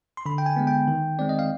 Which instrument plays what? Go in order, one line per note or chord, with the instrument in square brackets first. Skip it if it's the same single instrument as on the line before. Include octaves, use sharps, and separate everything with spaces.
[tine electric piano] C6
D3 B5
G5
G#5
G#3 B3
G5
D#3
G#3 C4 D5
D#5
F5